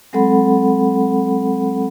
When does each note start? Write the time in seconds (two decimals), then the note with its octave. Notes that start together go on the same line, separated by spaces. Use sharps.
0.13 F#3 G#3 C4 A4 F#5 B5